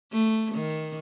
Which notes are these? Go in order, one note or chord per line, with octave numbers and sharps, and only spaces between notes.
A3
D#3